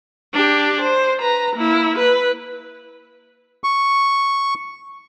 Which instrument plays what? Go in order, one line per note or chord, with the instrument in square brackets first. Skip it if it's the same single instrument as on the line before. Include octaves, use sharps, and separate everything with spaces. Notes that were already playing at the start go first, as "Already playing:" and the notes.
[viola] D4 G4
C5
B4 A#5
A#3 E4
B4
[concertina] C#6